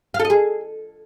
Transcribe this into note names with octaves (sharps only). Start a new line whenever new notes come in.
F5
A4
D#5
G#4